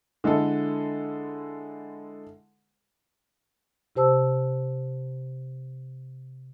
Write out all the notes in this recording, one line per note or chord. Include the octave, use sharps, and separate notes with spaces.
D3 G#3 E4 A4
C3 G4 C5 A5 E6